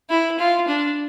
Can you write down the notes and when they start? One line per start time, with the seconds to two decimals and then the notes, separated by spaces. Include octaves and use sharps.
0.10 E4
0.39 F4
0.68 D4